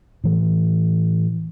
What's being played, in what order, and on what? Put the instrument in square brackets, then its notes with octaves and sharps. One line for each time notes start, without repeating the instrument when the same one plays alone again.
[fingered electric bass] A2 E3